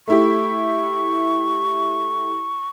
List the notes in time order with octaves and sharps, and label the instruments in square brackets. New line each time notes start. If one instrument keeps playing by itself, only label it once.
[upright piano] A3 E4 G4 [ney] C#6